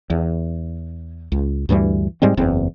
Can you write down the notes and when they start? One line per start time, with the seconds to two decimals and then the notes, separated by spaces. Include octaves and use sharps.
0.10 E2
1.32 C#2
1.69 D2 G2 E3 G3
2.22 G#2 G3 G#3 C4
2.37 F#1 E2 C4